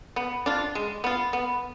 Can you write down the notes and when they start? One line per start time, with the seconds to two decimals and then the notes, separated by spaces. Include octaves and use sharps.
0.16 B3
0.46 D4 F4
0.75 G#3
1.04 B3 F4
1.33 B3